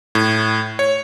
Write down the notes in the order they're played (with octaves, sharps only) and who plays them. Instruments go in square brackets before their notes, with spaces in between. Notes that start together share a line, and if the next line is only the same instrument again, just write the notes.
[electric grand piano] A2
C#5